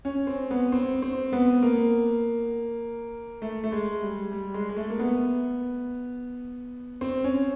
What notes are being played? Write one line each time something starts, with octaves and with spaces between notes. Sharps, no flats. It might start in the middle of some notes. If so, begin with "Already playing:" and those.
C#4
C4
B3
C4
C4
B3
A#3
A3
A3
G#3
G3
G3
G#3
G#3
A3
A#3
B3
C4
C#4